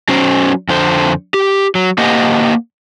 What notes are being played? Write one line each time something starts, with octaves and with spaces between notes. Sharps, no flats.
F#3 C#4 C5
F2 D3 C5
G4
F#3
A#3 G4 C5 D#5 F#5